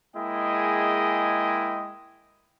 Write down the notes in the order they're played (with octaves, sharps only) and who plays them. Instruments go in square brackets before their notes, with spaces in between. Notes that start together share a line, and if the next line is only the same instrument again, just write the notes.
[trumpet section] G#3 A#3 E4 G#4 D#5 G5